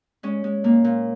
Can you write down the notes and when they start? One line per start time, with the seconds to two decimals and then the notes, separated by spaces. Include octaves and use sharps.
0.23 G#3 C#4
0.44 G#3
0.64 A#2 A#3
0.84 A#2